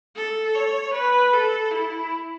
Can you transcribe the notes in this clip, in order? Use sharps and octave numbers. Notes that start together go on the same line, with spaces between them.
A4
C#5
B4
A4
E4